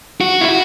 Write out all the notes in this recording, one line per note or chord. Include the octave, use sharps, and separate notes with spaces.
F#4
E4
F#4